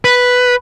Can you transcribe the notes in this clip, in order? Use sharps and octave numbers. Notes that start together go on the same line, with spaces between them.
B4